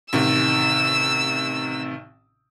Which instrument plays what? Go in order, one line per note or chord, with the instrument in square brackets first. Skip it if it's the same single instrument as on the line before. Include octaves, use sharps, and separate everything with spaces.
[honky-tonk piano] A1 C3 D#3 [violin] E6